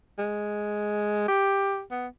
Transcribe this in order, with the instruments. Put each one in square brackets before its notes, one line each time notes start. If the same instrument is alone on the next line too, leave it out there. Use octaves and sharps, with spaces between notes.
[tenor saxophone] G#3
G4
B3